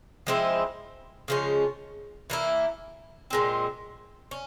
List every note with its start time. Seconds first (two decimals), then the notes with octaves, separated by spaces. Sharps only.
0.27 F3 G#3 C4 E4
1.28 C#3 F3 G#3 C#4
2.30 E3 A#3 E4
3.30 A#2 G#3 C4
4.31 C#4